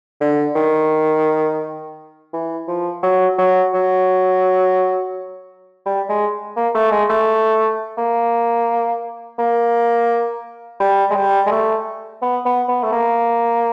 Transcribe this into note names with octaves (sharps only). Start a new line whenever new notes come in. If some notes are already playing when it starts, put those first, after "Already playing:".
D3
D#3
E3
F3
F#3
F#3
F#3
G3
G#3
A#3
A3
G#3
A3
A#3
A#3
G3
G#3
G3
G#3
A3
B3
B3
B3
A3
A#3